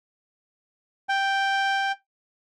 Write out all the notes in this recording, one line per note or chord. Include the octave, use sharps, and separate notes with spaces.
G5